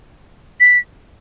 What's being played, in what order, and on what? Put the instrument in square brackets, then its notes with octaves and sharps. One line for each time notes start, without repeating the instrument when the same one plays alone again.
[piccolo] B6